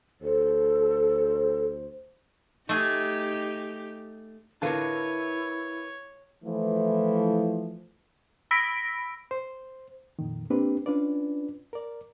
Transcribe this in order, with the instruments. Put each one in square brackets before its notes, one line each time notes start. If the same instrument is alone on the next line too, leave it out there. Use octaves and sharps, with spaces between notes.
[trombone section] D2 C5 [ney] A4
[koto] A3 G#4 [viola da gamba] D#4 G4
[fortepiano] D3 F4 [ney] E4 [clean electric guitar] A#4 B4 A5 [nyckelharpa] C#5
[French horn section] E3 F3 A3
[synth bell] B5 E6 A#6 B6 D7
[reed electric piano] C5
F2 A#2 D#3
A#3 C4 D4 G4 B4
C#4 D4 F4 B4 D5
A#4 D5